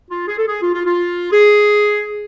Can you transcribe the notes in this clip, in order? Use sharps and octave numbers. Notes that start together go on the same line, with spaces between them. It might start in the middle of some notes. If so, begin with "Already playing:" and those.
F4
G#4
A4
G#4
F4
F4
F4
G#4